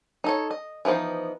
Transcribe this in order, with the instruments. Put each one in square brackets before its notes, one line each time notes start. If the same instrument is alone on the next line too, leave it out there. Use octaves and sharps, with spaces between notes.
[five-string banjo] D#4 A4 C#5
D#5
E3 F3 B3 D#4 C5